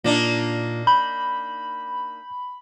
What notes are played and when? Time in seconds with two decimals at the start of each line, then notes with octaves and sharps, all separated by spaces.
0.04 A#2 A#3 D4 D#4
0.87 B5 G6